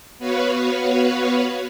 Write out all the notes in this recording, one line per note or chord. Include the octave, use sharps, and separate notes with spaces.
B3 F#4 B4 C#5 F5